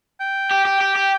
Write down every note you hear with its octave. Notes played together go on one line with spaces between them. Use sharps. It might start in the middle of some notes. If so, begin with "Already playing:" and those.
G5
G4
G4
G4
G4